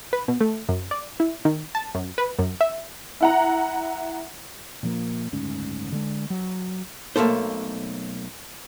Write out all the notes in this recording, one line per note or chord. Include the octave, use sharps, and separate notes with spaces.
B4
B2
A3
F#2
D5
E4
D#3
A5
F#2
B4
F#2
E5
E4 F#5 A#5
A#2 F3 A#3
F#1 D2 G#2 C#4
D3 G#3
F#3
B1 A3 A#3 A4 C5